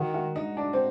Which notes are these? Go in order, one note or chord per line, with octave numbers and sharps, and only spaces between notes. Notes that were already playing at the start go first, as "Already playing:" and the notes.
Already playing: D#3 F#4
F#4
D#4
D4
C4